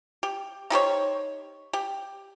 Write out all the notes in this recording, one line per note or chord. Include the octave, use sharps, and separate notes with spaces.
G4
D#4 G4 C5 C#5
G4